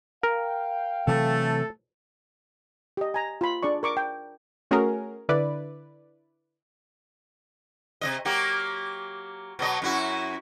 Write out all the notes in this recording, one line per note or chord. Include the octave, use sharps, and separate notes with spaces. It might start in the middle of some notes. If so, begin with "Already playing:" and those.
A#4 F5 G5
C3 E3 F#3 A3 A4
G4 D#5
G#5 A#5
F4 B5
D4 G#4 D5 C#6
A#4 C#6 D6
G5
A3 C#4 F#4 G#4 A#4
D3 E4 B4 D5
C3 F3 D#5
F#3 A#3 G4
B2 F#3 D#5
F#2 E4 F#4